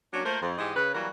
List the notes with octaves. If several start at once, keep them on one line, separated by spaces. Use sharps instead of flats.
F#3 A#3 C#4 D4
A3 A#3 F4 A#4 C5
F2
G#2 E3 G4 D#5
C#3 B4
E3 F#3 G3 A#3 F#4 A#4